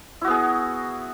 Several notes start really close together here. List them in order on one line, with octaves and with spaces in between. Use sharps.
E4 F#4 B3 G#4